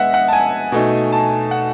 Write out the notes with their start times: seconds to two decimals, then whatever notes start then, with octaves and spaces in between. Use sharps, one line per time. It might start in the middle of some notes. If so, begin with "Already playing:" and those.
Already playing: G#3 B3 D#5 E5 F#5
0.14 F#5
0.28 A5
0.33 G#5
0.72 B2 A3 D#4
1.12 A5
1.51 F#5